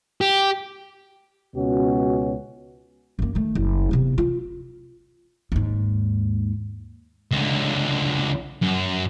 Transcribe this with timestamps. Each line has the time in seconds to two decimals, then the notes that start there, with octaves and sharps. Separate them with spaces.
0.21 G4
1.55 C#2 B2 C#4 F#4
3.19 F#2 A#3
3.35 D#3 A3
3.55 F#1
3.91 C3 B3
4.18 F4
5.52 D#2 G#2
7.31 C#2 D3
8.62 F#2